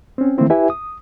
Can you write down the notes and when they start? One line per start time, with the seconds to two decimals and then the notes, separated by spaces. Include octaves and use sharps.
0.18 C4 C#4
0.38 D#3 E3 A3 A#3 C4 E4
0.50 E4 G4 B4 E5 G#5
0.70 D#6